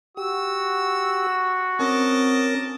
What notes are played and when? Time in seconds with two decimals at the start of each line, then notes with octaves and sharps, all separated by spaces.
0.17 F#4 G4 E6
1.80 C4 C#4 A#4 D#5 A5 D6